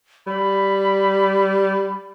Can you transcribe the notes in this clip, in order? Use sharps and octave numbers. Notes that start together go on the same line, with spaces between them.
G3 B5